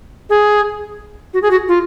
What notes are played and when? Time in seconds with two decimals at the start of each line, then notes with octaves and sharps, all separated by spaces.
0.30 G#4
1.34 F#4
1.42 G#4
1.51 F#4
1.68 F4